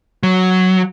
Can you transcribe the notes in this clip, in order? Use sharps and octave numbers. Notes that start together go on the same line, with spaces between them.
F#3